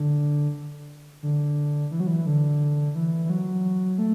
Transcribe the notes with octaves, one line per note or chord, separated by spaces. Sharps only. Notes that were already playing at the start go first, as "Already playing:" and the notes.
Already playing: D3
D3
E3
F#3
E3
D3
E3
E3
F#3
A3